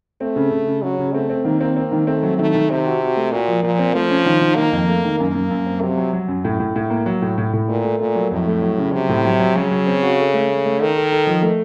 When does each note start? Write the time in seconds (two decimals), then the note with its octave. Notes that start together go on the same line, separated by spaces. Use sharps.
0.21 A3 C4
0.36 C#3
0.51 C#3
0.67 C#3
0.83 C#3 F#3
0.99 C#3
1.14 A3 C4
1.30 C4
1.45 D#3 A#3
1.61 C4
1.76 C4
1.92 D#3
2.07 A3 C4
2.23 F#3
2.38 D#3 A3
2.54 D#3
2.70 C3 C4
2.86 F#4
3.02 F#4
3.16 A3
3.32 A#2 F#4
3.48 F3
3.63 A#2 F3
3.79 C4
3.94 F3 A3
4.10 C#4
4.26 D#3
4.41 D#3
4.56 D#3 A#3
4.72 F2
4.89 A3
5.04 D#3
5.20 F#2 A#3
5.35 F#2
5.51 F#2
5.66 C4
5.81 C3 F#3
5.97 F#3
6.13 F#3
6.28 F#2
6.44 A2
6.60 A2
6.76 A2
6.90 A#3
7.06 F#3
7.22 A2
7.38 A2
7.53 A2
7.68 A#2 A3
7.84 A3
7.99 A#2 A3
8.15 F#3
8.31 F2 A2
8.47 A3
8.62 F#3
8.78 C#3
8.93 C3 F#3
9.09 A2
9.25 F#3
9.40 F#3
9.56 C#3 F#3
9.71 F#3
9.87 C4
10.02 F#4
10.18 A4
10.34 A3
10.50 A3
10.65 A3
10.80 D#3 A4
10.96 A4
11.12 A4
11.27 F3
11.42 A3